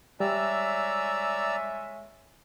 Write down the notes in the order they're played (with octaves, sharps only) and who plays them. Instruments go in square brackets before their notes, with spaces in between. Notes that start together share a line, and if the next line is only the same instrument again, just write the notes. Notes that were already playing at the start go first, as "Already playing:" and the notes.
[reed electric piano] G3 [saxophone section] G#3 C#5 E5 [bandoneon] D5 A#5 E6